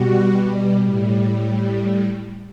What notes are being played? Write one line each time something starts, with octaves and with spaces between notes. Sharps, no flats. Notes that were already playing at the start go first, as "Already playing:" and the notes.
Already playing: B2 G3 F#4
A2 G3